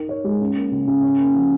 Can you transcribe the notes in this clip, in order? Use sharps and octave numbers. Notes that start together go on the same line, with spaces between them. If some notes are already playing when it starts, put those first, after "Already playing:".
Already playing: D#4 A#4
C#5
G#3
C#4
A#3
C#3
C#3
C#4
A#3
F3